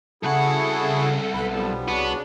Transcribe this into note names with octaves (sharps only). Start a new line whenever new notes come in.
C2 C#3 E4 F#4 G#4 A4 F#5
B1 B4 B5
F3 G3 B3
C2 C#3 B3 D4 F#4